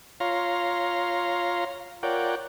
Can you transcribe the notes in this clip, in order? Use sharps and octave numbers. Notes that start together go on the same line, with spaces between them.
F4 C#5 F5 A#5 C6
F4 A#4 C#5 D5 F#5 G5